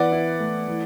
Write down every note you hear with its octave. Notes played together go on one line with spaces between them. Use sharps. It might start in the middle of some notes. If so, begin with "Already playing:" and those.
Already playing: E3 B3 D5 F#5
E4
A3
E3